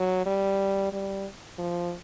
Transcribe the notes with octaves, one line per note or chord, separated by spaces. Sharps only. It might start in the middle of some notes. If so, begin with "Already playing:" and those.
Already playing: F#3
G3
G3
F3